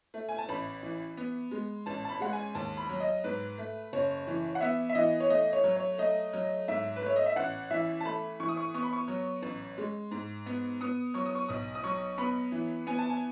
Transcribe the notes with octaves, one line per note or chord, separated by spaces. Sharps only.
A3
G#5
A5
A1 B5
E3
B3
G#3
A1 A5
A5
B5
G#3 F#5
G#5
D#2 A5
B5
F#3
D#5
G#2 B4
A3
F#1 C#5
E3
F#5
B3 E5
E5
E3 D#5
C#5
A3 D#5
C#5
F#3
C#5
A3 D#5
F#3
G#2 E5
B4
A3 C#5
D#5
E5
A1 F#5
E3 E5
A5
A3 B5
E3 C#6
D#6
C#6
B3 C#6
B5
C#6
F#3
A1
G#3
G#2
B3
B3 D#6
F#3 C#6
D#6
C#6
B1 D#6
D#6
F#3 C#6
B3 B5
E3
B3 G#5
A5
G#5